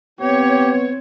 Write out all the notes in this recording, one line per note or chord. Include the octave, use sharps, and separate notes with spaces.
B3 C4 G4 C#5